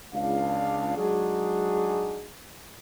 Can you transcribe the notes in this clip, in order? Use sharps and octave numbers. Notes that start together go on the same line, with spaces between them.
C#2 D4 F5
F#3 G#3 D4 D#4 F#4 G#4